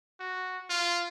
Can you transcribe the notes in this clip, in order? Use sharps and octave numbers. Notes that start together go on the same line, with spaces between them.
F#4
F4